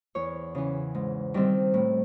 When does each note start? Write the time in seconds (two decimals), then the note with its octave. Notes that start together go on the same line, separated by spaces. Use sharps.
0.15 E2 C#5
0.55 C#3 E3
0.95 G#2
1.34 D#3 G3 C4
1.74 A2